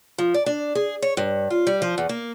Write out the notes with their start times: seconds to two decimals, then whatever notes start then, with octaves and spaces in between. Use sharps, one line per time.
0.18 F3
0.34 D5
0.46 D4
0.75 G#4
1.02 C#5
1.17 G2
1.50 F4
1.67 G3
1.82 F3
1.98 E2
2.09 A#3